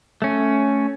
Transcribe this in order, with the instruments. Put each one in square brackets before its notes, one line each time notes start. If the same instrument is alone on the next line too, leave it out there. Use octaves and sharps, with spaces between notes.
[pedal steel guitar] A3 C#4